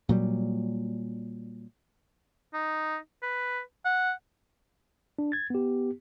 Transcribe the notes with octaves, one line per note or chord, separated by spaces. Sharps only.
A#2 F#3 G3
D#4
B4
F#5
D4
G#6 A6
B3 G4